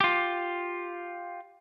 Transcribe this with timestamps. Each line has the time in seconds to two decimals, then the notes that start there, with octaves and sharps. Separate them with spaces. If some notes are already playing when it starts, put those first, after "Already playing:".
0.01 F4 G4